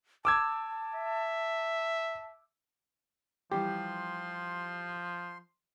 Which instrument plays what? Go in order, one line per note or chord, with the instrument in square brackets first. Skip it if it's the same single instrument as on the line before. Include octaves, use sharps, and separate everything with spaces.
[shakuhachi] A5 [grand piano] D6 E6 G#6
[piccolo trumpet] E5
[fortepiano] E3 G3 [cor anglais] F3 [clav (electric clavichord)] G4 [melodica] C6